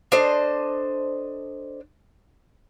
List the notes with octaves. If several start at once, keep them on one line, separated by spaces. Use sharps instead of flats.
D4 A4 C5 D#5